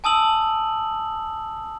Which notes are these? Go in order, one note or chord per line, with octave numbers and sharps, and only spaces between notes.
G#5 A5 D#6 E6 F#7